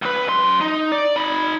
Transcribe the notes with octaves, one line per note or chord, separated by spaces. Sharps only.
C#2 B4
F#2 C6
D#4
D5
D#4 B5